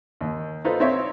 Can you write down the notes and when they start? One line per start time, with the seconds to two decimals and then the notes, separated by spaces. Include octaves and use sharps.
0.21 D#2
0.65 D#4 F4 A4 B4 C5
0.80 C4 D#4 F4 C#5 E5